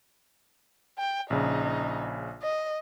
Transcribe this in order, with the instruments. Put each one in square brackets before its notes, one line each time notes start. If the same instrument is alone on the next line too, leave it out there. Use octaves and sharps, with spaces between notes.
[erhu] G5
[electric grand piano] A#1 C#3 [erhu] D#4
[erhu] D#5